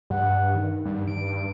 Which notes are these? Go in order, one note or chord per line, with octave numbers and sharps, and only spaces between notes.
G2 F#5
D#3
G2
D7